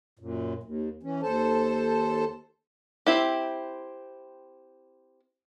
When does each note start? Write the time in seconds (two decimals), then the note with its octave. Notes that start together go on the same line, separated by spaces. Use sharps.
0.19 F#2 A#2
0.63 D#2
1.03 E3 C#4
1.22 D#2 A4 C5 A5
3.06 C4 E4 G4